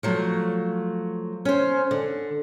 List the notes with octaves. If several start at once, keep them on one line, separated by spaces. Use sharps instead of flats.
F3 F#3 A3
C#4 C5
D3